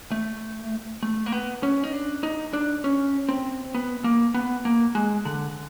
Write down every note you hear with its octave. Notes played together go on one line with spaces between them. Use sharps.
A3
A3
A#3
B3
C#4
D#4
D4
D#4
D4
C#4
C4
B3
A#3
B3
A#3
G#3
D3